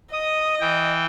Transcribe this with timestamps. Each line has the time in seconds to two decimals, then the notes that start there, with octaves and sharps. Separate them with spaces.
0.13 D#5 D#6
0.60 E3 G5